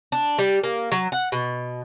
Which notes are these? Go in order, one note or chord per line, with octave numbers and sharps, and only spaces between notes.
D4
G3
A#3
F#3
F#5
B2